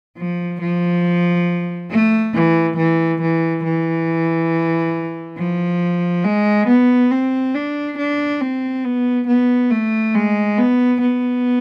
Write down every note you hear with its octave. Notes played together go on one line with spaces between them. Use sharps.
F3
F3
A3
E3
E3
E3
E3
F3
G#3
B3
C4
D4
D4
C4
B3
B3
A3
G#3
B3
B3